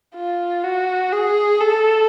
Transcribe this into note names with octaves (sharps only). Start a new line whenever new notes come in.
F4
F#4
G#4
A4